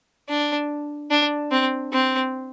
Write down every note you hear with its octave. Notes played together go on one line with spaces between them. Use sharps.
D4
D4
C4
C4